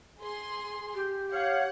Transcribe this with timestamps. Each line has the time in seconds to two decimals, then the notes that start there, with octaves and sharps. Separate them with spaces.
0.21 G#4 C6
0.94 G4
1.33 C#5 F5 F#5